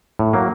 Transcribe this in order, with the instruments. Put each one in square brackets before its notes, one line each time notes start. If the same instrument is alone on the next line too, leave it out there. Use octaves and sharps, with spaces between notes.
[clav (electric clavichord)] A2
F#3 A#3